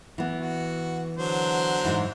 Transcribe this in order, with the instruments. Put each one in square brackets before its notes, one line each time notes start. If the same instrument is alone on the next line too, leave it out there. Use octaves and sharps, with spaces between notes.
[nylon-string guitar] E3 B3
[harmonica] F#4
D3 F#3 C5
[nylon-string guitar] G#2 E3